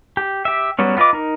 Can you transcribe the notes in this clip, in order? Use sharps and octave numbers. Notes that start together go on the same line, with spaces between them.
G4
G4 E5
F#3 G3 B3 C#4
B3 F4 B4 D#5 D6
D#4 A#4